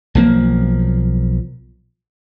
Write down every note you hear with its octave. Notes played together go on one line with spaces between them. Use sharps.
B1 F3 A#3